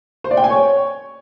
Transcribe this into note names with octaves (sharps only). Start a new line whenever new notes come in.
C5
D5
G5
G#5
C#5